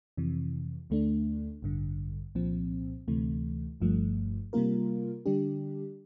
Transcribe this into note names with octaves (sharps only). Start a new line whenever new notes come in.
F2 C3 E3
D2 D3 A3 D4
A1 G2 D3
C2 A#2 F3 C4
D2 C3 E3 A3
G1 G2 F3 A3
C3 G3 A#3 F4 A#4
D3 G3 D4 G4